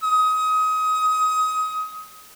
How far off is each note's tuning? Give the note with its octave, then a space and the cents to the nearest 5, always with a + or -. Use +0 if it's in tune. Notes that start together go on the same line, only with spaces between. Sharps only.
D#6 +25